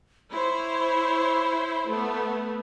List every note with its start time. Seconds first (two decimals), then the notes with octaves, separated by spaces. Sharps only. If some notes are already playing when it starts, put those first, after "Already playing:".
0.32 E4 C5 C#5 B5
1.89 A3 B3